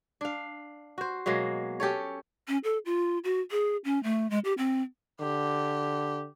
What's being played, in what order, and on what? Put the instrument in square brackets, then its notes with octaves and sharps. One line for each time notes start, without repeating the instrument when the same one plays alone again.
[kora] D4 F5
F#4 C5
B2 F#3 G#3 A#3
C#4 G4 A4 C#5
[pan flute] C#4
A4
F4
F#4
G#4
C#4
A3
G#3
G4
C4
[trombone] D3 [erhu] G4